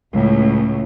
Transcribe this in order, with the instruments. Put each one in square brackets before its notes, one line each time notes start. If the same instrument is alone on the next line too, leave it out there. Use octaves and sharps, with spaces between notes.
[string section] C#2 A2